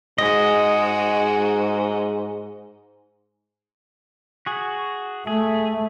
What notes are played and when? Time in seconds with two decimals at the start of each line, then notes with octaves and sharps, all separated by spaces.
0.18 G#2 G#3 F#4 D#5
4.46 F#4 G#4
5.27 A3 G#4